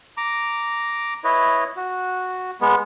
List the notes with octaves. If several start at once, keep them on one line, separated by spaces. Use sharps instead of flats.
A#5 D6
E4 B4 C#5 D#5
F#4
G#3 B3